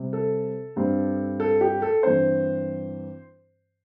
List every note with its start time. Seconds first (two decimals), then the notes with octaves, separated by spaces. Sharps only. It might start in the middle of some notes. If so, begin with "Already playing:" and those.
Already playing: C3 G3 C4
0.13 A4
0.76 G2 G3 C4
1.40 A4
1.61 G4
1.82 A4
2.03 G2 E3 C4 C5